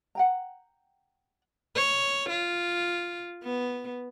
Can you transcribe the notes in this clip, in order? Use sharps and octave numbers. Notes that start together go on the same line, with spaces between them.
F#5 G5 A#5
C#5
F4
B3